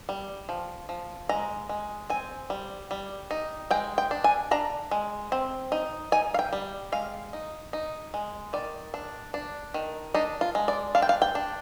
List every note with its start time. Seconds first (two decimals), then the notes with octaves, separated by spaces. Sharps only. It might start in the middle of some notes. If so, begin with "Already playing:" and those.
0.09 G3
0.49 F3
0.89 F3
1.29 G#3 A#5
1.69 G#3
2.10 C4 G#5
2.50 G3
2.91 G3
3.31 D#4
3.71 G#3 G5
3.98 G5
4.11 D4
4.24 G#5
4.51 D4 A#5
4.91 G#3
5.32 C4
5.72 D#4
6.12 D#4 G#5
6.34 F5
6.39 G5
6.53 G3
6.92 G#3 F5
7.33 D#4
7.73 D#4
8.14 G#3
8.53 D#3 D5
8.94 D4
9.34 D4
9.74 D#3
10.14 D4 D#4
10.41 F4
10.55 G#3
10.68 D5
10.95 D4 F5
11.02 G5
11.09 F5
11.22 G5
11.35 D4